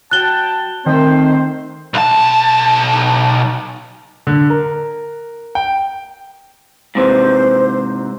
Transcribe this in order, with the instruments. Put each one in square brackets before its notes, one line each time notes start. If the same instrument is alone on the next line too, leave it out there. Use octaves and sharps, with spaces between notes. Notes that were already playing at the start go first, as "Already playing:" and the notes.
[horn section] F#3 G5 A5 [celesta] F#6 G7
[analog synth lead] D#3 [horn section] A3 C5 [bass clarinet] C4
[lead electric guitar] B1 A5
[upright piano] D3
A#4
G5
[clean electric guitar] G#2 C3 E3 [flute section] C5